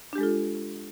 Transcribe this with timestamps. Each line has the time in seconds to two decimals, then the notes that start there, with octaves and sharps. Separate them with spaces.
0.13 D4
0.15 G4
0.18 G#3
0.21 A4
0.23 F4